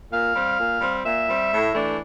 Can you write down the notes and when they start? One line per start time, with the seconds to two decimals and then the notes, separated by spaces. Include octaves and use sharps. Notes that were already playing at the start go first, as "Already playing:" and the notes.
0.11 A#2 F5
0.35 G3 C4
0.58 A#2
0.81 G3 C4
1.05 A#2 E5
1.28 G3 C4
1.51 A2
1.74 E3 A3 D4